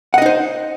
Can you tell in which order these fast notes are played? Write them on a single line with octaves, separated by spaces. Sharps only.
F#5 D#5 D#4 C5